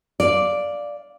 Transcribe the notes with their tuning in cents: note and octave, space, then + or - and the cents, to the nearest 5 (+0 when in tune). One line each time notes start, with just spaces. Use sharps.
D5 +0 F5 +0